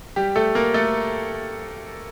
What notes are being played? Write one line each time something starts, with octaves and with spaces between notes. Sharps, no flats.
G3 G4
A3 A4
A#3 A#4
A3 A4